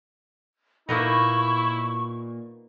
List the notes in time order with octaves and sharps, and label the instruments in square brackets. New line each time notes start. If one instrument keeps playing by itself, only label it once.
[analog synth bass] A#2 [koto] A#3 B3 D#4 [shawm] E4 [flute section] C#6